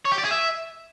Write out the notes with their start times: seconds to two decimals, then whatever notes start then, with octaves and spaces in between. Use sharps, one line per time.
0.05 C#5
0.12 G4
0.18 D5
0.24 G#4
0.31 E5